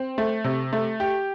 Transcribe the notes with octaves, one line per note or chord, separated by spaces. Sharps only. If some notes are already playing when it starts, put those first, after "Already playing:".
Already playing: C4
A3
C3
A3
G4